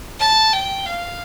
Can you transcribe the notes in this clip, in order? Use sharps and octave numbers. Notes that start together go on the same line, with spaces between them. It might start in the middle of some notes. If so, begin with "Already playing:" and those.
A5
G5
F5